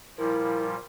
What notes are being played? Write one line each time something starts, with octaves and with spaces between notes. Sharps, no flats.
A#2 F3 G3 E4 A#4